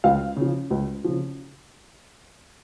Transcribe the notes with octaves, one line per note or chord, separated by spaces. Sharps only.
C#2 F5
C#3 F3
C#2
C#3 F3